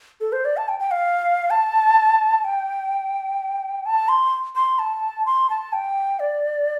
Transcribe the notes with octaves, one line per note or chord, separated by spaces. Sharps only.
A4
C5
D5
A5
G5
G5
F5
A5
G5
A5
C6
C6
A5
C6
A5
G5
D5